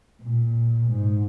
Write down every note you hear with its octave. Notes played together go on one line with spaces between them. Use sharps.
A#2
G#2